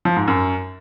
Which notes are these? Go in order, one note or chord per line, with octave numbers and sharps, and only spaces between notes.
F3
G#2
F#2